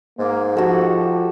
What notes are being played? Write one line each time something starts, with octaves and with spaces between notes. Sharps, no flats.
G#2 A#3
F3 F#4 G4 A4